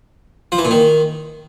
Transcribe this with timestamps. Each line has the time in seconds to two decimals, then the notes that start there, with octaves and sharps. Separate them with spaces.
0.52 F3
0.58 E3
0.65 A#2
0.71 D#3